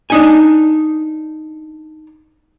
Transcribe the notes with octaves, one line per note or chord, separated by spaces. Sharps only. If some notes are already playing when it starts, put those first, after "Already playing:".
D4 D#4 G#5